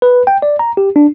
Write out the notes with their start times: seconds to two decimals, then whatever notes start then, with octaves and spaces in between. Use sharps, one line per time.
0.02 B4
0.27 G5
0.42 D5
0.59 A#5
0.77 G4
0.96 D4